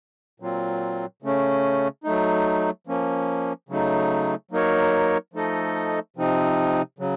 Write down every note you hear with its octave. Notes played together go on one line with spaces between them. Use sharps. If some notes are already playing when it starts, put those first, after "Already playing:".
A#2 F#3 C4 F4
C#3 A3 C#4
F#3 A3 D#4
F3 A#3 C#4
C#3 F#3 A3 D#4
F#3 A#3 D#4 A#4 C#5
F3 A3 D#4 A4 D#5
C3 F3 C4 D#4
C#3 F#3